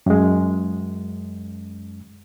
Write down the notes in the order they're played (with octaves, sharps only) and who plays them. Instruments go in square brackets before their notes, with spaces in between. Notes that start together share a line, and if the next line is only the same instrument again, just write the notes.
[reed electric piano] F#2 G#3